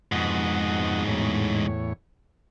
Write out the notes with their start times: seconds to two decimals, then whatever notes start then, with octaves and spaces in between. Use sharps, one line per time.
0.12 F2 G#2 B2 F#5 D#6
1.07 E2 A2 C#5